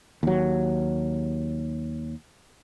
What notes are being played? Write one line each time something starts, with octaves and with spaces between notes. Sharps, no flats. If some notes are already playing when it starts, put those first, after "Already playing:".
D#2 F#3